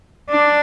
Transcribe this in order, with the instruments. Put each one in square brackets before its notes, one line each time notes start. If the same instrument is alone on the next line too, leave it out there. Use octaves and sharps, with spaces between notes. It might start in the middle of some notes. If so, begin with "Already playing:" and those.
[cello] D4